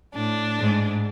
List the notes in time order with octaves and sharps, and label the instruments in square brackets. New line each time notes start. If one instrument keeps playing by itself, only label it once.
[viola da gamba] A2 [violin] D4
[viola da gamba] G#2